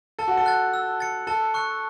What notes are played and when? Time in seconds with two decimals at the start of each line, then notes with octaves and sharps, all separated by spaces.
0.19 A4 A5
0.28 F#4
0.37 A4
0.46 F#6 A6
0.74 E6
1.00 A6 C#7
1.27 A4 A5
1.54 C#6 F#6 C#7